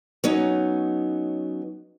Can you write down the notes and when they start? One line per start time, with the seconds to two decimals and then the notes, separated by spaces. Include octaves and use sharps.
0.24 F#3 B3 C#4 D#4